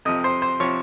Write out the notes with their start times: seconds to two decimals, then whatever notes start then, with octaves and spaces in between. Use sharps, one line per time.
0.05 F2 C3 F3 D#5
0.24 C5
0.42 C5
0.60 C3 F3 C#5